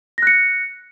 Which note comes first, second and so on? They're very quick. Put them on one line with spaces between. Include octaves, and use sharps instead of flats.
A#6 F#6 C#7